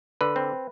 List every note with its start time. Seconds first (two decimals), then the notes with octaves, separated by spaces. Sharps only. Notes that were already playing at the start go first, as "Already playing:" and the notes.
0.21 D3 B4
0.36 C4